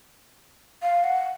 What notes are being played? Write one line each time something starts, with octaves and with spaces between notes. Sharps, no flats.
F5
F#5